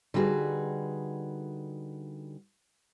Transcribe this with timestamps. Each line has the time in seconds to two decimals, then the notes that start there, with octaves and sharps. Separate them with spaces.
0.14 D3 G3 D#4 F#4 G#4 B4